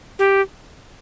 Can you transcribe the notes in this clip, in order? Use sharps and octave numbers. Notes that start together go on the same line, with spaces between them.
G4